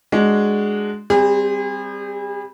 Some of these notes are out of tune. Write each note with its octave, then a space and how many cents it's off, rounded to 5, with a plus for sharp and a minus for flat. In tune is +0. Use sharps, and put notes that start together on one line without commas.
G#3 +0 D4 +5 F#4 +5
G3 +0 C4 -5 G#4 -40